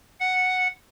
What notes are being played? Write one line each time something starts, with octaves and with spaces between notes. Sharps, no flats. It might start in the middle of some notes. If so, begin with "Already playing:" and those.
F#5